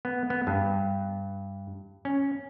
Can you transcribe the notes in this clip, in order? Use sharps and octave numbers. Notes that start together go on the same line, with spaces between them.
B3
B3
G2
C#4